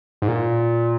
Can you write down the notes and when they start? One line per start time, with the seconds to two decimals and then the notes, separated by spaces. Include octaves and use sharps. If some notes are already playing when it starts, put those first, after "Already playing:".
0.22 G#2
0.28 A#2